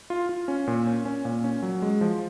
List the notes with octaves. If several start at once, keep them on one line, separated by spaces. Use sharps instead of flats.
F4
F4
C#4
A#2
C#4
C#4
A#2
C#4
F#3
G#3
F3